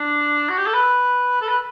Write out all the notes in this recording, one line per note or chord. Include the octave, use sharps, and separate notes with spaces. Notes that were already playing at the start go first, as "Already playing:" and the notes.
Already playing: D4
F#4
G4
A4
B4
A4
B4